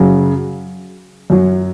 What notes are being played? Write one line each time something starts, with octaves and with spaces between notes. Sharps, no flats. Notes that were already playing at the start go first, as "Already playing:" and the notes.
Already playing: F#2 C#3 F#3
F#2 F#3